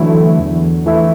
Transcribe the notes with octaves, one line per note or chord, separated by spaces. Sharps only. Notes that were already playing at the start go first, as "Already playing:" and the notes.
Already playing: D3 E3 F#3 A3 E4
E2
E3 A3 E4